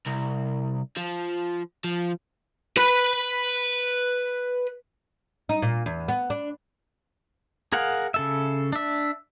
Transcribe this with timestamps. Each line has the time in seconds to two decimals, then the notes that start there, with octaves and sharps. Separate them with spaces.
0.06 C2
0.97 F3
1.84 F3
2.77 B4 B5
5.49 D#4
5.62 A#2
5.86 E2
6.08 B3
6.30 D4
7.72 G#4 A#4 F5 F#5
8.14 C#3 A4 E5
8.73 D4 E5